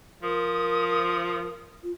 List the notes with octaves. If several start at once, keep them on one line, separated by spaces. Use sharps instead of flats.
F3 A#4 D#6
F4